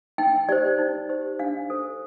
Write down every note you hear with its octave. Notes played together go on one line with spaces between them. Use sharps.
D#4 G5
G4 C5 D5
D#4
G4 C5
D4 F5
A4 C5